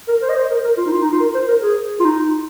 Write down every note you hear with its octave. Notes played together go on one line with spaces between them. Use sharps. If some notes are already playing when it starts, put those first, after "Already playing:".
A#4
C5
D#5
C5
A#4
A#4
F4
D#4
F4
D#4
F4
A#4
C5
A#4
G#4
F4
D#4